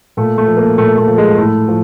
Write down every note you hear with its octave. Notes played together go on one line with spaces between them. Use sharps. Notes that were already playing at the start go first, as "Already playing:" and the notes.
A#2 A3
A3
F3
A#3
A#2 A3
A3
F3
G#3
A2 A3
F3